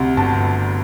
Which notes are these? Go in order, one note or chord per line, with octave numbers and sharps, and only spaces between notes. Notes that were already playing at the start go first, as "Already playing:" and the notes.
Already playing: D2 C3
G1 A5